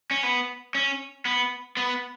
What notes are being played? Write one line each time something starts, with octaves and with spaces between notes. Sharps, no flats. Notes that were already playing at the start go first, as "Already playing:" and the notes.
C#4
B3
C#4
B3
B3